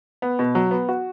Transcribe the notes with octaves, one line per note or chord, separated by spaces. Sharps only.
B3
B2
F#3
B3
F#4